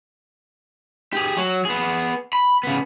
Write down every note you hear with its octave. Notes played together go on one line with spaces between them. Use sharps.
G4 G#4
F#3
B3 G#4
B5
C#3 B3